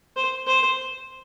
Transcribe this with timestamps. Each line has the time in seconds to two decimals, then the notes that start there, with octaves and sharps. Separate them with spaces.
0.16 C5
0.47 C5